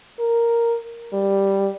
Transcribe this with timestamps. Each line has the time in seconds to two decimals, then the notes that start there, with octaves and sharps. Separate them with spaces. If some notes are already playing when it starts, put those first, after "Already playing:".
0.20 A#4
1.13 G3